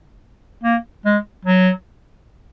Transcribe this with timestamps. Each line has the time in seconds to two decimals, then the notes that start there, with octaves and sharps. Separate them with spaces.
0.64 A#3
1.05 G#3
1.45 F#3